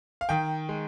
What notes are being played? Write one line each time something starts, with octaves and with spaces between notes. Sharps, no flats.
F5
D#3 G5
G#3